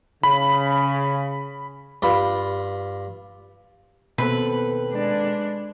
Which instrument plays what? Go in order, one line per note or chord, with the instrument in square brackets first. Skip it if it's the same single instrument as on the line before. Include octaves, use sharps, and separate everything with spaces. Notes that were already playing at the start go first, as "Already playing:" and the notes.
[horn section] C#3 [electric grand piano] B5
[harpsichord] G2 F4 B5
[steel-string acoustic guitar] D#2 C4 A4 [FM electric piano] B2 [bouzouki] B4
[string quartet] G#3 D4 D5